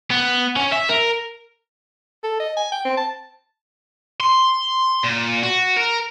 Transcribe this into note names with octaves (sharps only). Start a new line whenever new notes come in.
B3
C#4
E5
A#4
A4
D#5
G#5
G5
C4
A5
C6
A#2
F#4
A#4